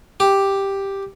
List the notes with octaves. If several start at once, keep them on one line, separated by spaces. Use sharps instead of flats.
G4